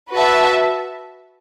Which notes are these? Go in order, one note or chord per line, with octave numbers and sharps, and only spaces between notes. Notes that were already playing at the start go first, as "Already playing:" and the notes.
F#4 B4 E5 A5